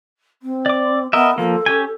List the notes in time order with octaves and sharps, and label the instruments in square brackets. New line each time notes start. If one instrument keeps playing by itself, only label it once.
[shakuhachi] C4
[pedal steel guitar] D5 D6
[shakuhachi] B3 [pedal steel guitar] A#4 D#5 E5
[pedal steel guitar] F3 A#3 [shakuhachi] A4
[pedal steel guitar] C#4 G4 G#5